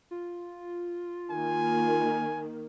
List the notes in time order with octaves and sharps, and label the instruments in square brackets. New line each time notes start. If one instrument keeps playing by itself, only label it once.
[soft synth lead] F4
[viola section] D#3 A#3 [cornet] G#5